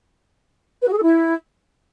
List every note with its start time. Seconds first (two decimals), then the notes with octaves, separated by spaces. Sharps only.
0.82 B4
0.87 F#4
0.92 G#4
0.98 A4
1.03 E4